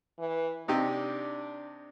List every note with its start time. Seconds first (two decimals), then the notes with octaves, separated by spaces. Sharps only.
0.19 E3
0.68 C3 D4 D#4 G4